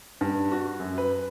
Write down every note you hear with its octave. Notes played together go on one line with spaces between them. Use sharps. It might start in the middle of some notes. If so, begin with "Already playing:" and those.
G2
F#4
F#2
B4